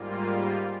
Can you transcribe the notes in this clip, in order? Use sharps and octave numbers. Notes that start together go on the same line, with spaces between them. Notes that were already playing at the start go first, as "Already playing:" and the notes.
Already playing: G#2 G3 A#3 F4